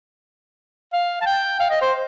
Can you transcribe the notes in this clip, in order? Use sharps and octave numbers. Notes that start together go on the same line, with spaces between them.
F5
A5
G5
F5
D#5
C5